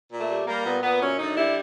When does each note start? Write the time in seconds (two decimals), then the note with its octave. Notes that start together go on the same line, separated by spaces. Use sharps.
0.11 A#2
0.20 A3
0.29 G3
0.46 G3 A#3
0.65 A#2 B3
0.83 A#2 B3
1.01 F#2 C#4
1.19 D3 D#4
1.37 G3 E4